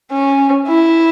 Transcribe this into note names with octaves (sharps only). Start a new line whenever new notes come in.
C#4
E4